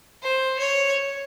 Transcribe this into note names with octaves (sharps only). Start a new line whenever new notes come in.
C5
C#5